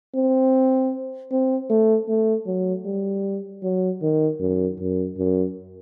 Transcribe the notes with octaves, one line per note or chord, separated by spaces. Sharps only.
C4
C4
A3
A3
F#3
G3
F#3
D#3
F#2
F#2
F#2